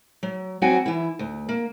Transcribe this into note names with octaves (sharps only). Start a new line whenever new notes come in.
F#3
F#3 B3 C4 F#4 G5 G#5
E3 E4
D2
A#3